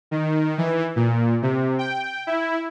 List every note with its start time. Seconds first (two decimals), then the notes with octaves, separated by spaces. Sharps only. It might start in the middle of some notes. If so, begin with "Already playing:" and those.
0.11 D#3
0.58 E3
0.96 A#2
1.42 C3
1.79 G5
2.27 E4